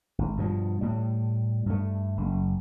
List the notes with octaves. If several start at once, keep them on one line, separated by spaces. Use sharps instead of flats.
G#1
G2 B2 F3
A2 G3
G2 A3
F#1